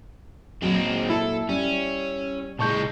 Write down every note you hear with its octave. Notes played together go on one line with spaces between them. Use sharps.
A#2 F#3 G#3 C4
E4 A4
G3 C#4
A#2 G#3 A5 C#6 G6